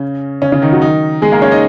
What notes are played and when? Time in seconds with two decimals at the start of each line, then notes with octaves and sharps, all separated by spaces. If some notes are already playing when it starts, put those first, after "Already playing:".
Already playing: C#3 C#4
0.42 C#3 C#4
0.52 C#3 C#4
0.62 D#3 D#4
0.72 F#3 F#4
0.82 D#3 D#4
1.22 G#3 G#4
1.32 A#3 A#4
1.42 C#4 C#5
1.51 D#4 D#5